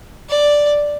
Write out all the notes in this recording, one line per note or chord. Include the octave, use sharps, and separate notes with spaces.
D5